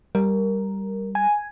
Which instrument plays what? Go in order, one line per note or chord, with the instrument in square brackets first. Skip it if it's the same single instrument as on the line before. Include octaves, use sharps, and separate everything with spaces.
[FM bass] G3 [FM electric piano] A#4
[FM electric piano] G#5